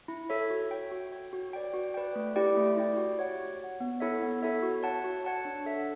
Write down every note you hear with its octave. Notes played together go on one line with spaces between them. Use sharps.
E4
A4 C#5 E5
F#4
C#5 G5
F#4
C#5 G5
F#4
B4 D5 G5
F#4
B4 D5 G5
A3
E4 G4 D5 G5
A3
E4 G4 D5 G5
F#4
C#5 F#5
F#4
C#5 F#5
B3
E4 A4 C#5 E5
B3
E4 A4 C#5 E5
F#4
C#5 F#5 A5
F#4
C#5 F#5 A5
D4
A4 E5